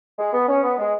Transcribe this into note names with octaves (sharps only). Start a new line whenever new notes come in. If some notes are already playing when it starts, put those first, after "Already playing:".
G#3
B3
C#4
B3
G#3